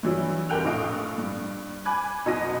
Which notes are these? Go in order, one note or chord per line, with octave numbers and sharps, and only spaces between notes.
G2 E3 F#3
F1 G4 A#4 G5 F#6 F7
A#1 A2 F3 D#5 F5 D7
G2
G#5 B5 D6 F#6 G#6
F#1 B2 D#4 F#4 A#6 D#7